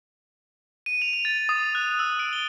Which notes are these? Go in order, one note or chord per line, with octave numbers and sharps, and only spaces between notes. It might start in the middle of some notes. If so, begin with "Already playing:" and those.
D#7
F7
F7
A6
D#6
F#6
E6
D7
G7